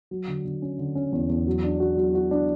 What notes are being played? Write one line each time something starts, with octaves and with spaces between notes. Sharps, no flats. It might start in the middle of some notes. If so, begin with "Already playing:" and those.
F#3
D3
D3
C#4
D3
C#4
E2
E2
F#3
D4
F#4
F#3
F#4
D4